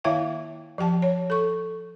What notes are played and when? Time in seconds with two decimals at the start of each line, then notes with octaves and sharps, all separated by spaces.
0.04 D#3 A#3 E4 E5 F5 G5
0.78 F3 G4 G5 A5
1.02 C#5
1.30 A4 C#6